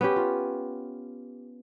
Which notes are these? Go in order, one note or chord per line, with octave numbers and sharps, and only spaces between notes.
B3 C#4 G4
F4